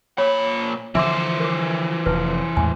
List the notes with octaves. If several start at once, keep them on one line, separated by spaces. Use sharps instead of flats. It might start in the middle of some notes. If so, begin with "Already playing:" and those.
A#2 C#5 B5
D3 E3 F3 C5 E5 C6 D6
A#4 D6
F1 F2 B4
E2 A2 G#3 G#5